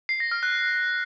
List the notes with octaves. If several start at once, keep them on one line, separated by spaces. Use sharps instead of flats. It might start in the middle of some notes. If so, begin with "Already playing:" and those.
C7
A#6
F6
F#6